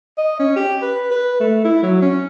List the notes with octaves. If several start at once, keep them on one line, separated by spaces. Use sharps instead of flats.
D#5
C#4
G4
B4
B4
A3
E4
F#3
C#4